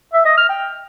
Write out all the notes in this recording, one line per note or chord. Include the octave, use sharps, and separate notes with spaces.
E5
D#5
F6
G5